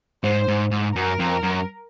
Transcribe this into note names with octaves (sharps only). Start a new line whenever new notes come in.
G#2 C5
G#2
G#2
F#2 A#4
F2
F#2